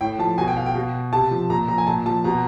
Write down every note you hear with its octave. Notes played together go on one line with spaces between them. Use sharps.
A2 G5
F3 A5
B2 G#5
G5
F5
G5
B2
C3 A5
F3
A#2 A#5
F3 A#5
G#5
A#2 A5
F3 A5
B2 A#5